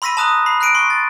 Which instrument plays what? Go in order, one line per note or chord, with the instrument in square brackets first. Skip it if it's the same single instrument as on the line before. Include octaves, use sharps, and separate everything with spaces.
[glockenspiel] B5 C6 E6 A#6 B6 D#7
A5 A#5 D#6 F#6 D#7 F7
B5 C7
F#6 A#6 C7 D7 D#7
C6 C#6
A6